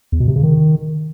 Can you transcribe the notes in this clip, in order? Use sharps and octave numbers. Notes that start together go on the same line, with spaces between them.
E2
B2
C3
C#3
D#3